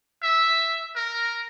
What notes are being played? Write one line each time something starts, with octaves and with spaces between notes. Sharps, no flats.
E5
A#4